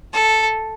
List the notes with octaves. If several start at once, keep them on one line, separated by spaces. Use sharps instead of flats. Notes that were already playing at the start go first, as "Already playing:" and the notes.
A4